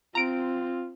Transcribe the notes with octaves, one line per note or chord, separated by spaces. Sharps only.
C4 F4 A#5 D7